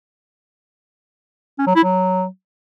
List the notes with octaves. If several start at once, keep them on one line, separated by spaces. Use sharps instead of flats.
C#4
F#3
E4
F#3